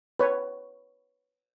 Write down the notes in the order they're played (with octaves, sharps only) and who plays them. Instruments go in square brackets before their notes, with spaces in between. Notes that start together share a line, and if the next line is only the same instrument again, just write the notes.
[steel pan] B4 C#5